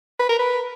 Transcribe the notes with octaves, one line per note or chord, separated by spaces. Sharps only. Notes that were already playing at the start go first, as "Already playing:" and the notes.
B4
A#4
B4